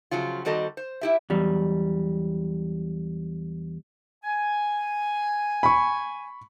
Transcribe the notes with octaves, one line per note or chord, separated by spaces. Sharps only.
C#3 F3 F#3 F4
D#3 G3 C4 F#4 A4 D#5
C5
E4 G4 E5
E2 F#3 G3
G#5
B5 C#6